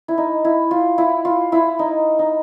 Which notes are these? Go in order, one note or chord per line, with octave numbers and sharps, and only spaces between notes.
E4
D#4
E4
F4
E4
F4
E4
D#4
D#4